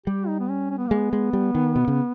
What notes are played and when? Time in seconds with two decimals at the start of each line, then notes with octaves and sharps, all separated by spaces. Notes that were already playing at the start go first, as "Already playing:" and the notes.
0.06 G3 G4
0.28 D#4
0.39 B3
0.49 C#4
0.71 C#4
0.78 B3
0.88 G#3 A#3
0.96 B3
1.13 G#3
1.33 G3
1.55 D#3
1.76 B2
1.88 C#3